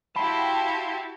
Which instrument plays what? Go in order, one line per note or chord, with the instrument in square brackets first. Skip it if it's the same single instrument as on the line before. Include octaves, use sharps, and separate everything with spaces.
[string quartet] E4 F#4 G4 [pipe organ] F5 G5 C6 [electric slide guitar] A5 [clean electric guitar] B5